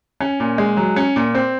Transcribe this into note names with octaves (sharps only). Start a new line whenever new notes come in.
C#4
A#2
G#3
F#3
C#4
A#2
C4